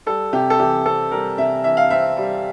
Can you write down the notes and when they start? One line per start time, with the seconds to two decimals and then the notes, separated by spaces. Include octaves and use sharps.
0.06 G3 A4
0.33 C3 G4
0.50 A4
0.59 E3 G4
0.85 C4 A4
1.12 G3 A#4
1.38 C3 E5
1.64 E3 E5
1.77 F5
1.90 C4 E5
2.17 G3